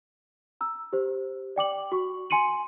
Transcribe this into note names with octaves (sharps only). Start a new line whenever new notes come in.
A#5 E6
G4 C5
D5 G5 D6 F#7
F#4 C#6
G#5 C6 C#7 D#7 F#7